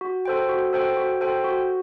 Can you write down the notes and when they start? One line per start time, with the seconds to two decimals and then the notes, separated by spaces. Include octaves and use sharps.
0.01 F#4
0.26 A4 C5 G5
0.49 F#4
0.73 A4 C5 G5
0.97 F#4
1.21 A4 C5 G5
1.44 F#4